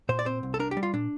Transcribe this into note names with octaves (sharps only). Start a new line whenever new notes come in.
A#2 C5
D5
C4 C5
C2
A4
D4 A#4
G4
G3
F4
A#2 D4